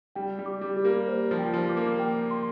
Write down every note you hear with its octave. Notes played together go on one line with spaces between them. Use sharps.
G3 G5
G3
D6
G3
G4
A#3
C5
F3
G5
F3
D6
A#3
G5
C6